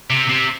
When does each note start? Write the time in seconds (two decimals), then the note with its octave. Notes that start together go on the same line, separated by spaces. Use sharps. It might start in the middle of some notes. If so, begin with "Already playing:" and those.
0.10 C3
0.29 C3